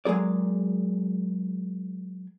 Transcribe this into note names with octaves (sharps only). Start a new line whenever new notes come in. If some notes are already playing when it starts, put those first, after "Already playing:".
F#3 G#3 A#3 G#4 D5